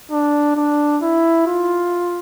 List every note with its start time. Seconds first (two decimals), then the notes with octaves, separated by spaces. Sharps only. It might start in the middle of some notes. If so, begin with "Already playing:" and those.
0.11 D4
0.56 D4
1.02 E4
1.47 F4